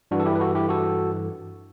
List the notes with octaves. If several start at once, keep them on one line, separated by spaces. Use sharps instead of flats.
G2 E3 D4 F#4
A4
E4 G4
B4
F#4 A4
E4 G4
F#4 A4